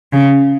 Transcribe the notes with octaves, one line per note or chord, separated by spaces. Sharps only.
C#3